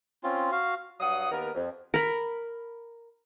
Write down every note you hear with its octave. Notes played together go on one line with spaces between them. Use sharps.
C4 C#4 F4
F#4 F5
G2 F#3 F5 F#5 D#6
D#2 B3 A#4
F2
A#4 B5